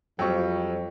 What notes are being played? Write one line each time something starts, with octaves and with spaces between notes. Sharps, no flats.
F2 F#3 G3 G5 C#6